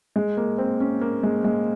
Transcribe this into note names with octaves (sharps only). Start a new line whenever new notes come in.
G#3
A#3
C4
C#4
A#3
G#3
G#3